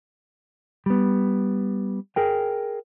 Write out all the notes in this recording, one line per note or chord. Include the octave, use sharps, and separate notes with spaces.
G3 B3
G#4 A#4 G5